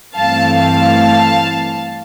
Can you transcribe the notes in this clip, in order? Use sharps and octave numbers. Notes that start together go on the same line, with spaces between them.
G2 E3 A3 C4 F5 A5
F5 A5